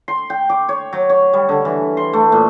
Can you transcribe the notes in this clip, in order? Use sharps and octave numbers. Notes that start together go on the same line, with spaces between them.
C6
G5
D6
C#5
F#3
C#5
G3
D3
E3
C6
A3
A#2